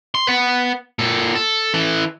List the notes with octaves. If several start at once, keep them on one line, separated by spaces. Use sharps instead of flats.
C6
B4 F#5
A#2 A4
A4
E3 A4